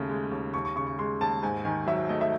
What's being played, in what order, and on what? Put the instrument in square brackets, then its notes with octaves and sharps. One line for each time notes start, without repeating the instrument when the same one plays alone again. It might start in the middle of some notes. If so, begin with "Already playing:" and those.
Already playing: [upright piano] D#2 C#3 A3
G#3
D#2
D#2 C#6
C#6
C#3 C#6
C#6
G#3 C6
D#2 A5
G#2 G#5
D#3 G#5
F#3 E5
A3 D#5
E5